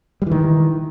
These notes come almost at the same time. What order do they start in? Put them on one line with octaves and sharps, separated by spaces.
G3 E3 D#3